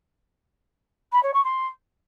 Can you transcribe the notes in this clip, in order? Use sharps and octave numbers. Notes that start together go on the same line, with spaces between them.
B5
C#5
C#6
C6